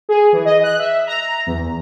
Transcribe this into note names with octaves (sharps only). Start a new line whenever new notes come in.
G#4
E3
D#5
F#6
E5
A#5
E2